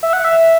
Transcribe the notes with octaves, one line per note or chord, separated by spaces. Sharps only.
E5
F#5
E5